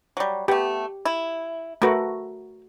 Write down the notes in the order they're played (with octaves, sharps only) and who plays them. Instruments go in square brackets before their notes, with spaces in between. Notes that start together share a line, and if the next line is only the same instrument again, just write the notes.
[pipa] F#3 G3
[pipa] A3 B3 [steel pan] G4
[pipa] E4
[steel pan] A3 F#4 [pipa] A#4 B4